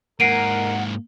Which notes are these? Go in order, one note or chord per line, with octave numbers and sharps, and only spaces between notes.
G#2 A#3 A#4 F#5 C7 D7 D#7